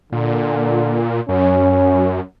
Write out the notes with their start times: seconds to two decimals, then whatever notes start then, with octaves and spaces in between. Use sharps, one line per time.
0.12 A#2 D3
1.29 F#2 C#4